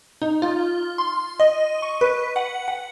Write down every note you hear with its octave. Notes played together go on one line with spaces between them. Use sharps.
D#4
F4
C6
D#5
C#6
B4
F#5
F#5